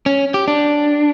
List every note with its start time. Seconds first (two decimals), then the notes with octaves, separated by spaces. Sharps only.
0.06 C#4
0.34 G4
0.48 D4